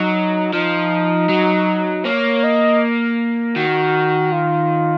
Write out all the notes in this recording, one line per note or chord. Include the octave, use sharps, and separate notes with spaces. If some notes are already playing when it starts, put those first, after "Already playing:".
Already playing: F#3 D#4
F3 D#4
F#3
A#3 C#5
D#5
D#3 F#4
F4